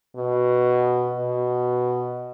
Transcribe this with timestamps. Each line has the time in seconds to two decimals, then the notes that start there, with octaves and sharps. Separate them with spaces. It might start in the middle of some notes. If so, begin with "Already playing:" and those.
0.16 B2
1.17 B2